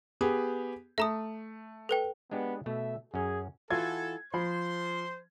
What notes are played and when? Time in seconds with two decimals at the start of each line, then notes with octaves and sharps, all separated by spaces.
0.21 B3 G4 G#4
0.98 A3 E5 A#5 D#6
1.89 A4 B4 G5
2.31 G#3 B3 D4 G4
2.66 B2 A3 E5
3.14 F#2 C#4 G#4
3.71 E3 F4 F#4 A4 G#6
4.34 F3 C5 B5 C6